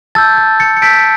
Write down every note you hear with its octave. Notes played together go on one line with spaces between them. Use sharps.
A5 E6 G6 A6
A6
A6 C#7
C#7
A5 E6 G6 B6 D7